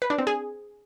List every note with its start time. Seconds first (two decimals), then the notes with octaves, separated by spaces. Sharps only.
0.02 B4
0.10 D4
0.18 C4
0.27 G#4